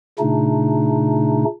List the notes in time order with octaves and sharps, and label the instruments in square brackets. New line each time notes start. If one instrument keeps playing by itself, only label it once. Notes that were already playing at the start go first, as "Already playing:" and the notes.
[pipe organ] A#2 C#3 A3 D4 D#4